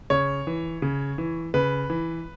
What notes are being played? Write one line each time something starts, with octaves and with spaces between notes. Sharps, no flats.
C#3 C#5
E3
C#3
E3
C#3 B4
E3